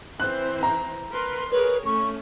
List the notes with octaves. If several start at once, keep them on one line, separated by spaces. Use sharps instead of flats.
E3 C4 C5 F#6
A#5
A#4 B4 C6
G#4 A#4 B4 C#5
A3 C#4 C#6